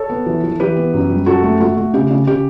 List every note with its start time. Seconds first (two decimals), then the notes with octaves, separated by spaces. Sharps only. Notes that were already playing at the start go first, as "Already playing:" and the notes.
Already playing: A4 C#5
0.10 B3
0.26 E3
0.44 E3
0.60 E3 G4 B4
0.77 B3
0.94 F#2
1.10 G3
1.26 F#2 F#4 A4
1.43 A3
1.60 A3 F#4
1.77 A3
1.94 C#3 G4
2.10 C#3
2.27 C#3 G4